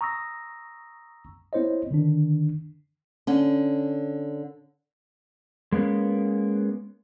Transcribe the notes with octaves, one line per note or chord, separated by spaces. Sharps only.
A#5 C#6 D#6 E6 A#6
B3 C4 E4 C5 C#5 D#5
D3 D#3 D4
D3 C#4
G#3 A#3 B3 C#4